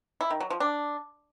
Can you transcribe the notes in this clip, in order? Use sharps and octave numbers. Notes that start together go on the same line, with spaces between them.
E4
D#3
F#3
F3
D4